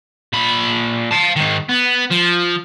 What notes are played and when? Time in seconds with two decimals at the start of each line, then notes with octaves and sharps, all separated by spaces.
0.33 A#2 B5
1.11 F5 A5
1.36 G#2 D#3
1.69 B3
2.11 F3